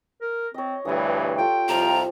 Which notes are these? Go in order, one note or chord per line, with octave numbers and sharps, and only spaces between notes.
A#4
C4 C#5 D#5
D2 G2 E3 G3 D4 C#6 D#6
F4 G4 A4 G5
C2 F2 F3 G4 C5 A#5